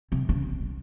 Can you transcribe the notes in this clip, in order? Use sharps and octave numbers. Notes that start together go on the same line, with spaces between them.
C3
C#3